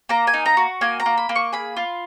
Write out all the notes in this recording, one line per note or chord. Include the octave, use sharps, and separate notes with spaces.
A#3 A#5
G#5
D#4
A#5
F#4
A#3 G#5
A#5
A#3
B5
A#3
C#6
G#4 B5
F4